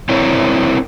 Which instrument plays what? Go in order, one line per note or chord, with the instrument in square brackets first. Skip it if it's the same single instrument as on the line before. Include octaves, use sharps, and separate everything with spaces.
[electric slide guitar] C4 D4 E4 A#4 C5 C#5